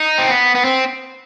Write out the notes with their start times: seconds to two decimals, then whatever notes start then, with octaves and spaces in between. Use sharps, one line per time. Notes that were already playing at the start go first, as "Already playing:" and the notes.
Already playing: D#4
0.18 C4
0.29 B3
0.55 B3
0.64 C4